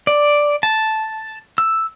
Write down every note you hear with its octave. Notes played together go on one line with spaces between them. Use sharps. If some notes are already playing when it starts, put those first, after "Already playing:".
D5
A5
E6